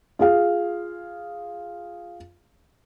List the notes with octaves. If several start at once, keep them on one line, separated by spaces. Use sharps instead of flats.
F4 G#4 F5